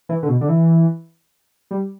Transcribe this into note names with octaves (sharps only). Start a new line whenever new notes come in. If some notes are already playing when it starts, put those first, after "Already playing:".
E3
D3
B2
D3
E3
G3